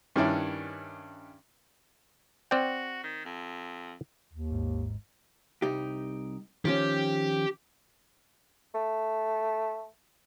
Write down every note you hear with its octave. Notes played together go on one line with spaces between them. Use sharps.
G2 D#3 C#4 D4 E4
C4 F#4 D5 G5
D#3
F2
D#2
G#1 G#2
C2 D#4 G4
D#3 F3 C#4 G4
A3